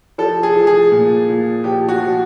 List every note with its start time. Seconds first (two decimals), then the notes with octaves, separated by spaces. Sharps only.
0.18 F3 A4
0.43 G#4
0.56 F3
0.67 G#4
0.92 A#2
1.29 A#2
1.64 F3 G4
1.89 F#4
2.01 F3